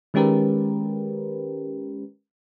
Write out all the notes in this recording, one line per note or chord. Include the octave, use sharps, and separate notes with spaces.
D#3 G#3 C#4 G4 A#4 B4